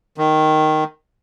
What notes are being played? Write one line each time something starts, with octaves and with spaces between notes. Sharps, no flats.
D#3